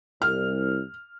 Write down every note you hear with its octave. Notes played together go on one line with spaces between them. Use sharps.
C2 F6